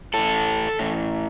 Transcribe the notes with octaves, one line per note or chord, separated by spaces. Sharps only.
A2 E3 A4
A2 E3